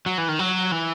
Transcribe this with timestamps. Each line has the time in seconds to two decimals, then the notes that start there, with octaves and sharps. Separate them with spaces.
0.06 F#3
0.18 E3
0.29 D#3
0.39 F#3
0.72 E3